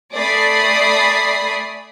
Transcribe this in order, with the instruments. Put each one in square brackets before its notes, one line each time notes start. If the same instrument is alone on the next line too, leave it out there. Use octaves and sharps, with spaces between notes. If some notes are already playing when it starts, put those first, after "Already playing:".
[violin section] A3 D5 G#5 B5 D#6 C7